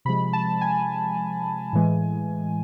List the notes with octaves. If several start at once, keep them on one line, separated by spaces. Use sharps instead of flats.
C3 F3 G#3 B5
A5
G#5
A2 E3 G#3